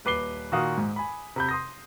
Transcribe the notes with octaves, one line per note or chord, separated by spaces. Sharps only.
D#1 B4 D6 C7 G7
A#2 D#3 F#4 F5 D#6
G#2
G#5 B5
C3 B5 G6
C6 D#6 A#6